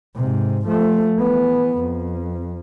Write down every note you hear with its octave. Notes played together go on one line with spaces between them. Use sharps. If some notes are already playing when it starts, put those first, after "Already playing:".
G#2 C3
F3 A3
E3 B3
F2